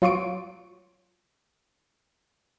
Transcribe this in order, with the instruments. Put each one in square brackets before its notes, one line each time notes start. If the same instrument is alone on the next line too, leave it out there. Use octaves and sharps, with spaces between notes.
[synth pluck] F#3 F4 C6 C#6 D7